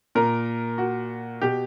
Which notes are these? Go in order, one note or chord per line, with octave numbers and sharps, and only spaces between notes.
A#2 A#4
F#4
B2 G4